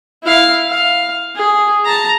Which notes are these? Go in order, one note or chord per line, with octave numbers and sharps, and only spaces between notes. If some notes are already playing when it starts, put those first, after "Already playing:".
E4 F5
F5
G#4
A5 A#5